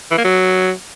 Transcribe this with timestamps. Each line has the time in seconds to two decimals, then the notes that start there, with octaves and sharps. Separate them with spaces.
0.11 E3
0.18 A#3
0.24 F#3